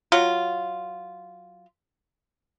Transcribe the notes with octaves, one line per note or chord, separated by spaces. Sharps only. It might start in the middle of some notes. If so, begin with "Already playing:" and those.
F#3 F4